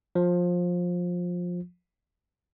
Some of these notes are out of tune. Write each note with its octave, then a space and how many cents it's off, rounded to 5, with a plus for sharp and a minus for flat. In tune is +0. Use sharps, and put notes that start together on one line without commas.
F3 +20